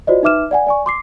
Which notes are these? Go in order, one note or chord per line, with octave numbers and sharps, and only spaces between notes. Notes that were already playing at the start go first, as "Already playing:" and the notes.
F4 F#4 C5 D5 D#5
D#4 B4 E5 D6 F6 E7
D5 F#5 G#5
D5 G#5 C#6
C6 D6 C7